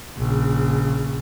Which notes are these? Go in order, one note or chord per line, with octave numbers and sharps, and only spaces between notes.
A#1 C#3